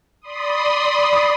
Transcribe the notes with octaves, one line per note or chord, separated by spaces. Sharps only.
D5 B5 C6 D#6